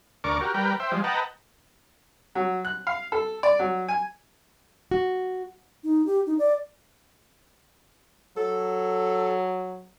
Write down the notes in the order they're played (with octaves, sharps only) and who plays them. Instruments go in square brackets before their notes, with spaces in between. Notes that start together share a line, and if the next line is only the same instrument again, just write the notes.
[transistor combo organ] D2 A#4 D5 C#6 D6
F#4 G4 A#4
G3 A#4 B4 G5
C5 E5 G5
F3 G3 G#3
B4 D#5 F#5 G5 A5 A#5
[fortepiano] F#3
F#6
F5
A4
D5
F#3
G#5
[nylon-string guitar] F#4
[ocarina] D#4
G4
D#4
D5
[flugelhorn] F#3 [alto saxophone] A4